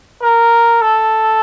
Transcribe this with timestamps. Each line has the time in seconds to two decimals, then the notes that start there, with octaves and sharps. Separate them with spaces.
0.23 A#4
0.82 A4